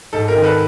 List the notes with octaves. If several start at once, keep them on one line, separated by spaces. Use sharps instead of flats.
G#2 A4
A#4
D#3
A4 B4